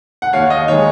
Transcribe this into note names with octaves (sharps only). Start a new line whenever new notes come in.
F#5
D#2 C#5 F5
D#5
D#3 G#3 C#5